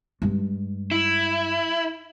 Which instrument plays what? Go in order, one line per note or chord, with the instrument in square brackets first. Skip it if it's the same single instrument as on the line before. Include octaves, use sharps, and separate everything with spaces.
[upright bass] G2 G#3
[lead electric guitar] E4